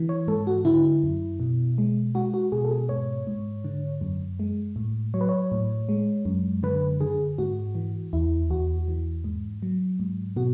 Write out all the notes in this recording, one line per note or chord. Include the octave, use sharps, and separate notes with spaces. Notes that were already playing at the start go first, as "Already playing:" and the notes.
Already playing: E3
C#5
G#2 A4
F#4
D3 E4
F#2
B2
G#3
G#3 F#4
F#4
B2 G#4
A4
G#4
G#2 C#5
G#2
D3
F#2
G#3
A2
F#3 C#5
B4
C#5
A2
G#3
F#2
D3 B4
D3 G#4
G#2 F#4
E3
E2 E4
E2 F#4
E3
G#2
F#3
G#2
B2 F#4